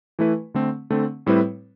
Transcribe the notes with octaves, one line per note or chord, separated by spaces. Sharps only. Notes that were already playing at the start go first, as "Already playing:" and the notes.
E3 A3 E4 B4
D3 A3 C4
D3 A3 C4
A2 G3 C4 E4 B4